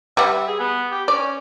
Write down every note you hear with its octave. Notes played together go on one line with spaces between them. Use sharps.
G3 B4 E5 F#5
G#4
B3
G4
C#4 D5